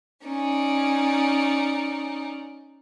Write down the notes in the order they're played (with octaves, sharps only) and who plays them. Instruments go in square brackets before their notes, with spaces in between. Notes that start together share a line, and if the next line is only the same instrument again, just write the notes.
[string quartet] C#4 D#4 D5